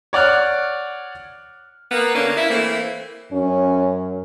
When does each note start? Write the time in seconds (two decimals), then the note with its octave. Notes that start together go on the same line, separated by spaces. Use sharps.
0.13 C#5 D5 F#5 F6 F#6
1.91 A#3 B3
2.14 D3 A#3 C#4 D4
2.37 E4
2.50 E3 A3 A#3 C4
3.32 F#2 C#4